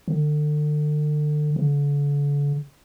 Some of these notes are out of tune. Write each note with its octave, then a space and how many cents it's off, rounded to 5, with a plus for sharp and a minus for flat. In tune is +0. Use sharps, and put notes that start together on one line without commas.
D3 +35
D3 -40